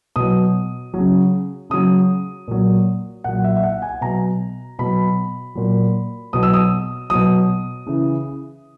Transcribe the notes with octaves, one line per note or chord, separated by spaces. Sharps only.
B2 F#3 D#6
C#3 F#3
C#3 F#3 D#6
A#2 F#3
A#2 F#3 F#5
E5
E5
F#5
G#5
B2 F#3 A#5
B2 F#3 B5
A#2 F#3
B2 F#3 D#6
E6
D#6
B2 F#3 D#6
C#3 E3